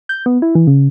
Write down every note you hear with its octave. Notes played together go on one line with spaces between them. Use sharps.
G6
B3
E4
E3
C#3